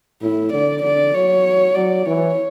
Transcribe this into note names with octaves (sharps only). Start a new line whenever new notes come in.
A2 E4
D3 D5
D3 D5
F#3 C#5
F#3 D5
E3 C#5